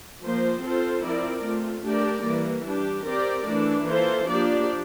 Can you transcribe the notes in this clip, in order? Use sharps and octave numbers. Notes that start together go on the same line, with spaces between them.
F3 A#3 F4 C5
C4 F4 A4 C5
F3 C4 E4 A#4 D5
A3 C4 F4
A3 D4 G4 A#4 D5
E3 G3 A#3
G3 D4 G4
C4 G4 A#4 D5
E3 A3 D4
E3 A#3 F4 A4 C5
F3 A#3 D4 G4 D5